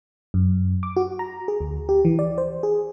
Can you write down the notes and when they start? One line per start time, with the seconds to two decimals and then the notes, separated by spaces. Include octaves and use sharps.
0.34 F#2
0.83 D6
0.96 F#4
1.19 A#5
1.48 G#4
1.60 D2
1.89 G4
2.05 E3
2.19 D5
2.38 C5
2.63 G#4